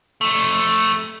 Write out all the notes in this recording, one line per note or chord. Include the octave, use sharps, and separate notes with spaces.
F2 A3